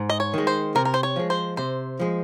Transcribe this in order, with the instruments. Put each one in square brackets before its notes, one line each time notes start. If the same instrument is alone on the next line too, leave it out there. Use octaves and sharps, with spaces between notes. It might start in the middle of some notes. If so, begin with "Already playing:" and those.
Already playing: [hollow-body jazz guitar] G#2
[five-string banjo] D#5
C#5
[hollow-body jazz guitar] D#3 G#3
[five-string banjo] C5
[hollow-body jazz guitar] C3 [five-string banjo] A#4
[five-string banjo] A#4
C5
C#5
[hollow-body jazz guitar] F3 G#3
[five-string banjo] C5
[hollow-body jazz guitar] C3 [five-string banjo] C5
[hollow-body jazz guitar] F3 G#3